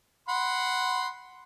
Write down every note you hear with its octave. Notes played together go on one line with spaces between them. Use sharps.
F#5 B5 C6